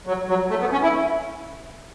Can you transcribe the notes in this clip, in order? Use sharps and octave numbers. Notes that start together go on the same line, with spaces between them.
F#3
F#3
A3
B3
C#4
E4